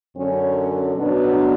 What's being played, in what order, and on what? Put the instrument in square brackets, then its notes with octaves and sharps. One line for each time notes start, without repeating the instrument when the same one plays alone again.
[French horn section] F#2 D3 F#3 C#4
B2 F#3 B3 D4